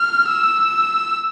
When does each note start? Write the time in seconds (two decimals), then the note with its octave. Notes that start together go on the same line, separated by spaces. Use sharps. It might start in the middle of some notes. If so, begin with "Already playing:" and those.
Already playing: F6
0.29 E6